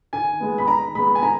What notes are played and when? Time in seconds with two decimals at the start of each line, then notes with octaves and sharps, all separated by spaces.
0.13 D#3 G#5
0.40 G#3 B3
0.58 B5
0.67 D#3 A#5
0.95 G#3 B3 B5
1.15 G#5
1.23 D#3 A#5